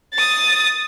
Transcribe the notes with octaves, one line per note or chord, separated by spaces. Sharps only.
D#6 A6